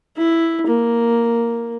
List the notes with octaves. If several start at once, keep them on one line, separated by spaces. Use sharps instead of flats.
E4
A#3